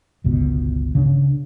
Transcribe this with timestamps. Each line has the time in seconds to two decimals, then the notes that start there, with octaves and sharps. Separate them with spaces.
0.24 G1 C#2 B2
0.95 C#3 D4